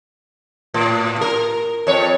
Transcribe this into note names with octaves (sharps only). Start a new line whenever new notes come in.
A2
A#4
F2 C#5